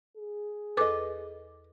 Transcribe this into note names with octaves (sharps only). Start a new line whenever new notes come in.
G#4
E2 A4 B4 D#5 D6